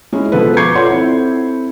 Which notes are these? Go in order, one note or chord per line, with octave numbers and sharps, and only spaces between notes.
G#3 C#4 E4
B2 F3 G#3 B3 A4 B4
C#6 D6 G6 G#6 C7 C#7
F4 A4 C#5 D5 F#5 C6
C4 E4 A4